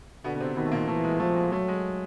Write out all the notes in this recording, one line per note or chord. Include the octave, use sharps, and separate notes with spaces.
B2 D3 B3
B3
C3 C4
B2 D#3 B3
A3
A#2 A#3
E3 A3
G#3
F3 A3
G#3
F#3 A3
G#3